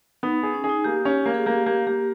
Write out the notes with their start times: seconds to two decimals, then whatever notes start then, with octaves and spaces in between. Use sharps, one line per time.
0.23 B3 D#4
0.43 G#4
0.54 C#4
0.64 G#4
0.69 D#4
0.84 A#3 G4
1.05 C#4
1.26 A#3
1.34 G#4
1.46 A#3 G4
1.66 A#3 G4
1.87 A#3 G4